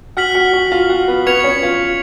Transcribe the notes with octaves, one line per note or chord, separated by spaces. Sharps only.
F#4 F#5 F6 B6 F#7
F#4 F#5
F#4 F#5
F4 F5
F#4 F#5
B3 B4
B3 B4 C#6 G#6 C#7 F7
C#4 C#5
F4 F5